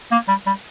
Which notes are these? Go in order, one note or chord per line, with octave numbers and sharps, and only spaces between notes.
A#3
G3
G3